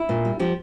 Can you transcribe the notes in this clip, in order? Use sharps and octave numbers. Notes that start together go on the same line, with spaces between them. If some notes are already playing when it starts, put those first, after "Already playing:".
Already playing: E4
A#2
G3
F3 G4